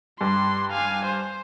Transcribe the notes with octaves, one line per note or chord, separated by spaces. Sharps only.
G2 C6
F5 G#5
C5